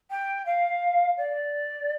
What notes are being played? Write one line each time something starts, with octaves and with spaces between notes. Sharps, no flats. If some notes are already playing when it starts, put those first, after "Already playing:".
G5
F5
D5